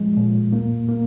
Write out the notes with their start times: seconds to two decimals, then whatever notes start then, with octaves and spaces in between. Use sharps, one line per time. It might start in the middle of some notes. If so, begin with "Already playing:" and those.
Already playing: A#2 F3 G#3
0.17 A#2
0.53 A#3
0.88 A#3